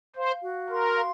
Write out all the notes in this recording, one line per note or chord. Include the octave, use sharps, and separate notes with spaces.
C5 F5
F#4
A#4 C6
F5